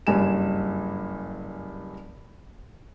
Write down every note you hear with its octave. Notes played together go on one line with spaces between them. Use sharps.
F#1 G2 G#5 E7